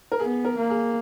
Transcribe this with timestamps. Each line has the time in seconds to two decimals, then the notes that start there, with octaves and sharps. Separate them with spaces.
0.12 A#4
0.19 B3 G#4
0.45 A#4
0.57 A#3
0.70 G#4